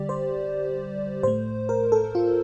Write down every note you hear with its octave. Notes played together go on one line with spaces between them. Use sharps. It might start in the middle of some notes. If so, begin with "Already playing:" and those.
Already playing: D3 G3 G4 D5
C5
A2 A3 C5
A#4
A4
F4